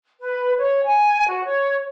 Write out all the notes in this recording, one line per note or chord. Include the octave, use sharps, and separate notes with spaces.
B4
C#5
G#5
F#4
C#5